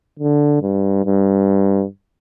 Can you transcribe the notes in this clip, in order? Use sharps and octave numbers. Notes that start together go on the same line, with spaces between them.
D3
G2
G2